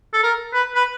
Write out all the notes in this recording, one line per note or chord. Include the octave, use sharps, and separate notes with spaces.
A4
A#4
B4
B4